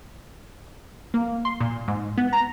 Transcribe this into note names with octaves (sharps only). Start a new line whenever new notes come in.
A#3
C6
A#2
G#2
B3
A#5